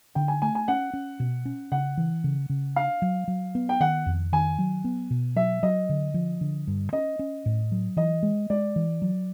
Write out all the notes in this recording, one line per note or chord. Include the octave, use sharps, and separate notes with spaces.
D3 G5
G#5
A3 G#5
G#5
C#4 F#5
C#4
B2
C#4
C#3 F#5
E3
C#3
C#3
D4 F5
F#3
F#3
B3
G5
D#3 F#5
F2
D#3 G#5
F#3
B3
B2
F#3 E5
F#3 D#5
D3
F3
D3
G2
C#4 D#5
C#4
A2
F#3
E3 D#5
G#3
G#3 D5
E3
F#3